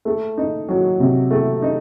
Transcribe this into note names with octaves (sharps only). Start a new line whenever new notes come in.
A3
D#4
F#3
C3
A3
D#4